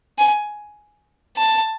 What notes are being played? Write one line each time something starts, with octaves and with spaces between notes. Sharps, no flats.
G#5
A5